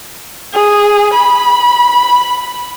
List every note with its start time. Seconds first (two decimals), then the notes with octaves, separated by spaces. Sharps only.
0.53 G#4
1.14 B5